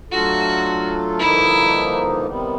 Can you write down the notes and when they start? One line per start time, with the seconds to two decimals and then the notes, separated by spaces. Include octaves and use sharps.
0.11 F#3 A3 D4 F4 F#4 A4
1.19 G2 D3 F3 A#3 D#4 E4
2.26 C3 D#3 G3 B3